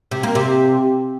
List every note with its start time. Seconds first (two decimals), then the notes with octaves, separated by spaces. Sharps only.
0.11 C3
0.23 A#3
0.35 C3